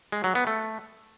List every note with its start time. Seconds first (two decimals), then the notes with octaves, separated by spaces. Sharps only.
0.12 G#3
0.24 F#3
0.35 B3
0.47 A3